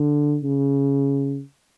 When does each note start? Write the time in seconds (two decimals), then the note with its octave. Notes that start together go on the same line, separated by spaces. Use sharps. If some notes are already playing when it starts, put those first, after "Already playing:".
Already playing: D3
0.43 C#3